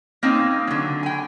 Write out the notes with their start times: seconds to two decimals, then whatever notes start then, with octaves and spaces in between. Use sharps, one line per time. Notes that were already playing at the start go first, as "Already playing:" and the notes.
0.23 A#3 C4 C#4 D#4
0.67 D3 F#3
1.03 G5 G#5